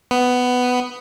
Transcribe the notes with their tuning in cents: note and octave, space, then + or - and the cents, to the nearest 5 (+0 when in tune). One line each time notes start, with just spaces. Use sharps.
B3 +10